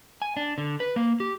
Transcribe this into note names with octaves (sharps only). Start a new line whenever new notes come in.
G#5
D4
D3
B4
A#3
G4